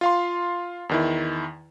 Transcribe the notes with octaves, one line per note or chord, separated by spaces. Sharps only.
F4 F5 C6
E2 D#3 E4